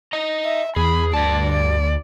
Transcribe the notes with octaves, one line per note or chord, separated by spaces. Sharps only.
D#5 A#5
E5
E2 G#4 B5
D2 G2 D5 A5
D5